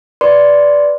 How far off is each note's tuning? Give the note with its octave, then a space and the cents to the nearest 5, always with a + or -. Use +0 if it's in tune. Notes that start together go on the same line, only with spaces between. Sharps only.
B4 +0 D5 -5 C6 +0